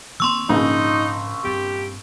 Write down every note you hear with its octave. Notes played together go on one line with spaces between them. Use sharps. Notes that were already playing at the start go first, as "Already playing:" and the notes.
D#3 A#3 C4 C6 C#6 E6
A#1 G#2 C#3 D#4
G2 C4 G4